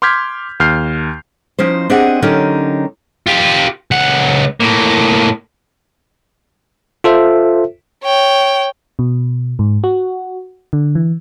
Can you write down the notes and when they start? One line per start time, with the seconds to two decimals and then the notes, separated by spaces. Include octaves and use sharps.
0.02 C6 D6 F6 G6 G#6 B6
0.60 D#2 F6 G6 C7
1.59 F3 C#4 D#4 C5
1.90 C4 D4 G4 G#4 D#5 F#5
2.22 D3 F#3 C#4 D#4 G4 A#4
3.27 F4 G4
3.91 C#2 F#5
4.60 A2 A#3
7.04 F4 A4 C5 E5
8.03 C#5 G5
8.99 B2
9.59 G#2
9.84 F#4
10.73 D3
10.95 E3